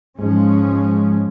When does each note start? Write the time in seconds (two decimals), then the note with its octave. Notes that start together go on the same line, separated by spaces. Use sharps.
0.19 G#2 F3 G#3 C#4